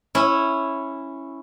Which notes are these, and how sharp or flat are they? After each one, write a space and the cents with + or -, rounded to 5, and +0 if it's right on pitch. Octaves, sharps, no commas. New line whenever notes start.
C#4 -10 E4 +0